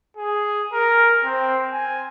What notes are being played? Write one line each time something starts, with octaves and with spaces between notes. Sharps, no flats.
G#4
A#4
C4
G#5